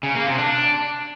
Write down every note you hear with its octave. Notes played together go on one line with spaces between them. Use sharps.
C#3
A#3
C3
D4